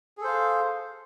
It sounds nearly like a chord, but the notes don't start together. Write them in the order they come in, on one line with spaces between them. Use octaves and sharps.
G#4 A4 C5 F5